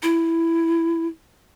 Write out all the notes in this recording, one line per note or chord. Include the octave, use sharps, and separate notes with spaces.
E4